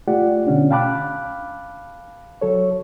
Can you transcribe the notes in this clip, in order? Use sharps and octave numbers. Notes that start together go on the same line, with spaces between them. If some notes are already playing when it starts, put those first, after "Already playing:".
A3 F4 G4 D5 F#5
B2 D3 C#4 D4
F5 G5 A5 B5 D6 F#6
F#3 A4 C#5